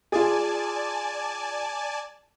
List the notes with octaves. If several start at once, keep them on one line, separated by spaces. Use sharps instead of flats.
F4 G#4 D5 G#5 A5